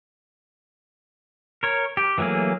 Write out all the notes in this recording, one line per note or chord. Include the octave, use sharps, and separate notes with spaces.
A#4 C#5
G4
E3 F#3 A3 A#3 G#4